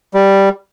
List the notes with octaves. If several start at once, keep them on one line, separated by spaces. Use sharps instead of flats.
G3